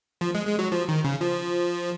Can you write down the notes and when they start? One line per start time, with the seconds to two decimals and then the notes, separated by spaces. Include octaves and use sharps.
0.21 F3
0.35 G#3
0.47 G#3
0.59 F#3
0.72 F3
0.88 D#3
1.04 C#3
1.21 F3